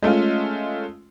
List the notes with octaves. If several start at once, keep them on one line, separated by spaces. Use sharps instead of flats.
G#3 A3 C#4 F4